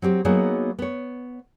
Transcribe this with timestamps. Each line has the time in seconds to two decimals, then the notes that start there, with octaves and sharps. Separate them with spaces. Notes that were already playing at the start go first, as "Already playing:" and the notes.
0.02 F#3 C4 G4
0.25 F#3 A#3 B3 D#4 F#4 G#4
0.79 B3 C#5